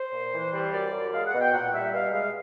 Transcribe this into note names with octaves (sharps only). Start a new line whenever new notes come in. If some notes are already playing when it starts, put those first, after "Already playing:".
Already playing: C5
A#2
E3
G3
F#2 D5
F#2
G#3 F5
F#5
B2
G5
A#2 F#5
G3 E5
B2 F5
G#3 F5